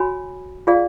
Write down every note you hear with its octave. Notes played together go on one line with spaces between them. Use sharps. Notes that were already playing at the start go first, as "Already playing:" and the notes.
Already playing: F#4 C#5 G#5 B5
F4 G#4 D5 F5